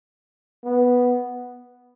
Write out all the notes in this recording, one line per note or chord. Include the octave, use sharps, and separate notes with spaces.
B3